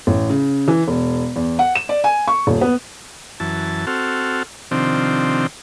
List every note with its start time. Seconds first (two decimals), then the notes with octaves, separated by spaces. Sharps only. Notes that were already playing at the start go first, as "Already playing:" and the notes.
0.07 A1
0.30 C#3
0.68 E3
0.88 E1
1.36 E2
1.59 F#5
1.76 E7
1.89 D5
2.04 G#5
2.28 C#6
2.47 D#1
2.61 B3
3.40 F#2 E3 A5
3.87 C4 F#4 A4 F6
4.71 C3 D#3 F3 C4 D4